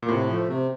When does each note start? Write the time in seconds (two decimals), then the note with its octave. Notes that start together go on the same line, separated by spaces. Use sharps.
0.03 A#2
0.08 A2 C3
0.28 F3 A3
0.48 C3